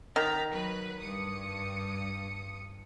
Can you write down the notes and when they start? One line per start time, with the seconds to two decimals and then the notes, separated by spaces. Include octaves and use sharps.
0.16 D#3 A#5 A6 B6
0.53 F#3 B4
1.00 G2 D#6 C#7